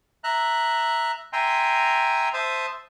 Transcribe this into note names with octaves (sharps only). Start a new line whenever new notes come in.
E5 A#5 F#6
E5 G5 G#5 A#5 C6
C5 E5 A5 D#6